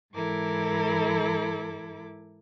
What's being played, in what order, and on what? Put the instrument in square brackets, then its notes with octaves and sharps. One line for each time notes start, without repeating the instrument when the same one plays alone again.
[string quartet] G#2 E3 E4 A4 A#4 D6